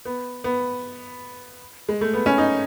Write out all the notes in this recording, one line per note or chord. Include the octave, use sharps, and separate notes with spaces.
B3
B3
G#3
A3
B3
C#4
D#4